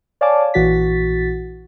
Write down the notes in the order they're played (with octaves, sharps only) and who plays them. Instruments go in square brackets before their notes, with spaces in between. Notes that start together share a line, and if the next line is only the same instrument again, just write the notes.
[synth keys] C#5 D5 F5 G#5 A5 D6
A#1 E3 F#4 A6 B6